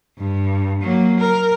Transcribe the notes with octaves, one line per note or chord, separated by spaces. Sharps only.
G2
F#3 A#3
A#4